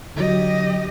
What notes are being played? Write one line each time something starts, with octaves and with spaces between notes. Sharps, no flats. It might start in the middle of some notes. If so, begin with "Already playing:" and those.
D3 F#3 G4 D#5